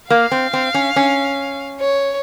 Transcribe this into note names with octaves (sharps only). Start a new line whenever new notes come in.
A#3 F5
C4
C4
C#4
C#4
C#5